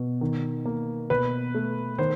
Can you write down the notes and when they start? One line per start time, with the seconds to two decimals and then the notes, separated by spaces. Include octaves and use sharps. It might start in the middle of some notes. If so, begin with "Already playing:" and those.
Already playing: B2
0.21 D#3
0.65 A#3
1.10 B2 B4
1.54 A3
1.98 D#3 C5